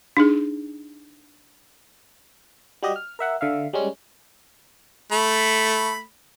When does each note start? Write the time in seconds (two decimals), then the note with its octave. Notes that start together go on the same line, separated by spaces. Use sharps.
0.17 D4 D#4 G#4
2.83 G3 F#4 G4 D#5
2.96 F6
3.19 A#4 E5 F#5
3.41 D3 E5 F5
3.73 G3 G#3 C#4
5.12 A3 B5